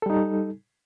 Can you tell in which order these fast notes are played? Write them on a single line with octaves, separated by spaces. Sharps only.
A4 G3 D#4